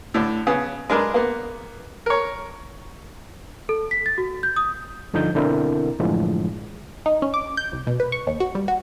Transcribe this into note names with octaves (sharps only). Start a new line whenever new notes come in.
A2 D3
C#3 B3 D#6
G#3 D4 A#4 B4 D#5
A#3 B3
A#4 C#5
A4
B6
A6
F#4
G6
D#6
G2 D3 F3 D#4 G6
B2 D3 C4 D4 E4 A#4
F#2 A2 D3 E3 F3 G#3
D#4
C#4
D6
G6
C2
B2
B4
C#6
D#2
F#4
G3
F#4